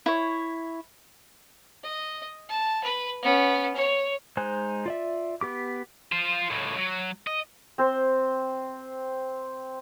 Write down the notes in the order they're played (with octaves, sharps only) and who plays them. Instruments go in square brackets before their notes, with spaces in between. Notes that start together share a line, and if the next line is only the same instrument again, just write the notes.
[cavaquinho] E4 C#5
[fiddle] D#5
A5
B4
B3 C#4
C#5
[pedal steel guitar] G#3 D#4 C5 G#5 F#6
F4 D5 E5
B3 G4 D6
[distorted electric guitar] F4 C5
C#2 A2
F#3
D#5
[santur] C4 C5